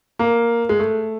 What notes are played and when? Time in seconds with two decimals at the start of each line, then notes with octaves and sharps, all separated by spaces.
0.19 A#3
0.69 G#3
0.80 A3